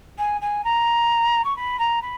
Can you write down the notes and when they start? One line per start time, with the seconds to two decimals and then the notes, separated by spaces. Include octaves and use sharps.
0.18 G#5
0.41 G#5
0.64 A#5
1.44 C#6
1.56 B5
1.79 A#5
2.02 B5